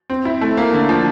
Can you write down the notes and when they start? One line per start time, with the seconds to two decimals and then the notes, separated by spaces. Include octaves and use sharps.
0.10 C4
0.25 E4
0.41 A3
0.57 A#3
0.73 D3
0.89 F3